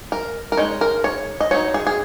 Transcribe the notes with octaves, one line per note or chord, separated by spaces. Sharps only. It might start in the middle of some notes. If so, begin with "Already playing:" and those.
A#4
A#4
G#3 D#4 C#5
A#4
C#5
D#5
F#3 D#4 C#5
G#4
G#4